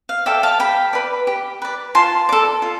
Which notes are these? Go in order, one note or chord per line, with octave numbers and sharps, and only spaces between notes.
F5
A4 D5 E5 G5
F5 A5
G4 G5 B5
B4 D5
G4
B4 D5
F4 A5 C6
A4 D5
F4